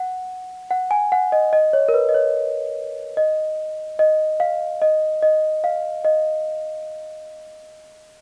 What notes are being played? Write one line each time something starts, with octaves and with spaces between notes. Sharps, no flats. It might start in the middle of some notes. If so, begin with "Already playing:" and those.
Already playing: F#5
F#5
G#5
F#5
D#5
D#5
C#5
A#4
B4
D#5
C#5
D#5
D#5
F5
D#5
D#5
F5
D#5